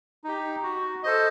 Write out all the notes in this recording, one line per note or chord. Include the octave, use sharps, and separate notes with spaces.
D#4 G4
F#4
A4 C5 D#5